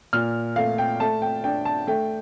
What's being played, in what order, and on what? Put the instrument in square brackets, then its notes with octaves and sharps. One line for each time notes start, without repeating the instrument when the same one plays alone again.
[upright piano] A#2 F6
A3 F5
G5
A3 A5
G5
D4 G5
A5
A3 G5